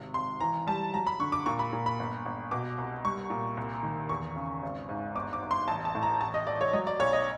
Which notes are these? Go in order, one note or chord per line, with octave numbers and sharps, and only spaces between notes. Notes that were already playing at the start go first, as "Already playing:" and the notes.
Already playing: G#1 C3
G#1 C6
E3 A#5
G3 A5
F#3 A#5
B5
D3 C#6
D6
A#2 C#6
B5
A#2
B5
G1
G1
B2 D6
C2
G3 C#6
A#2
C2
D#3
E2 C#6
C#3
G#1
G#2
G1 D6
D6
G1
C6
A1 A5
A5
A2
A#5
A1 A5
D#5
A1 D5
C#5
F#3 D#5
D5
B1 C#5
D#5